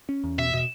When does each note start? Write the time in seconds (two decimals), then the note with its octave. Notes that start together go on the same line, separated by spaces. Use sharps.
0.09 C#4
0.24 E2
0.38 B2 E5
0.53 B2